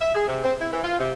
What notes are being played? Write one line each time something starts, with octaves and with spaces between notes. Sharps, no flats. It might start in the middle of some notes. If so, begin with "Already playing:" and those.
E5
G#4
C3
C4
E4
E3
F4
C3